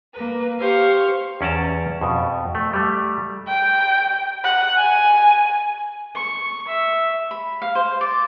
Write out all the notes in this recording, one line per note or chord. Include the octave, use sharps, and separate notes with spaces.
A#3 B4
G4 C5 F5 C#6
E2 C#4 D5 A5 A#5
F2 B2
A3
G3 A3
G5
F#5
G#5
C#6
E5
B5
F5
C5
D5